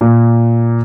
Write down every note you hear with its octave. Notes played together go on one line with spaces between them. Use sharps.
A#2